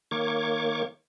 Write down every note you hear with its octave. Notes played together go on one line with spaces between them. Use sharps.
D#3 A#3 C#5 C#6 D6